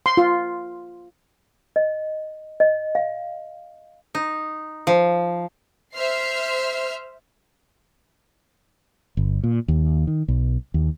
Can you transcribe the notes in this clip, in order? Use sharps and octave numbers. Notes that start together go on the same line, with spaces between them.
C6
F4
D#5
D#5
F5
D#4
F3
C5 E5 F6 C7
G1
A#2
D#2
D#3
B1
D#2